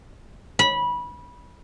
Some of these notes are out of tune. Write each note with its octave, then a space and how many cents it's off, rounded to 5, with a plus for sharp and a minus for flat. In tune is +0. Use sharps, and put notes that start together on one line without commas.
B5 -20